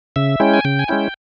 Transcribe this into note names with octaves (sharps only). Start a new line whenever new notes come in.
C#3 E5
G#3 C#4 E4 G5
G#5
C#3 G5
G#5
G#3 C#4 E4 G5